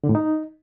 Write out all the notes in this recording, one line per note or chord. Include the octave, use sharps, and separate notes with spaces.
D3
A2
D#4